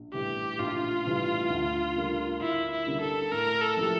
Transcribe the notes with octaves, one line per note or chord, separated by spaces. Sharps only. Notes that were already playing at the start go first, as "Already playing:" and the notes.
Already playing: A#1
A2 E3 G3 G4
A#1 F4
A2 E3 G3
D2
D3 G3 A#3
D2 E4
E4
D3 G3 A#3
A4
A2 A#4
A4
F3 A#3 E4 G4